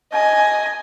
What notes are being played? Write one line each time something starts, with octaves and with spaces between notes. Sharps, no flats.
D#5 G#5